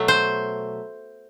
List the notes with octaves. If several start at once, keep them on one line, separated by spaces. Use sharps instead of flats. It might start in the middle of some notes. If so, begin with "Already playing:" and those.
Already playing: B2 F#3 A3
C5